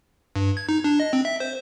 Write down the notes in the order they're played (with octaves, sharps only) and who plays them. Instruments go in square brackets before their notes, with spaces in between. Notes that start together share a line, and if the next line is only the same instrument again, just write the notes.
[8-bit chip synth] G2
G#6
D#4
D4
D#5
C4
E5
C5